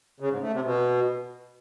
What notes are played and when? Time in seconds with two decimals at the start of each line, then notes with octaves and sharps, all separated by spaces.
0.20 C#3
0.31 G#2
0.42 A3
0.53 C3
0.64 B2